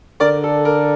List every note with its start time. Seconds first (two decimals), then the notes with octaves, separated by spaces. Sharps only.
0.20 D3 A#4 D5
0.44 A4
0.65 A#4